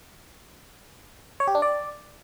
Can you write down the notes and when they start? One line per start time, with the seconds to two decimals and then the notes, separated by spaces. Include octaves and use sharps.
1.40 C#5
1.48 G4
1.55 D4
1.62 D5